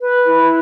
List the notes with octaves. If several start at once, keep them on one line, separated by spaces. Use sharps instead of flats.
B4
E4